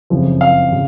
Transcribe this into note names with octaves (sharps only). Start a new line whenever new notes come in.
F#1 F2 C#3 F3
F5
C#3